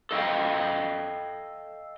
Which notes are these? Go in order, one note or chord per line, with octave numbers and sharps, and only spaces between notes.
A4 D#5 F5 G5